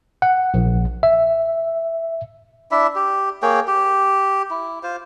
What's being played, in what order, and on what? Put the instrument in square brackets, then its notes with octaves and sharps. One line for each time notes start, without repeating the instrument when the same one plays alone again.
[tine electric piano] F#5
A#1
E5
[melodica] D4 E4 E5
G4
A#3 G#4 C#5 G5
G4
E4
F4 C5